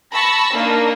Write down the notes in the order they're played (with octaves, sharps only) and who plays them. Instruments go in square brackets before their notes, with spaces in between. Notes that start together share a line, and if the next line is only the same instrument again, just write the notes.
[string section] A5 B5 C#6 E6 A#6
A#3 D4 D#4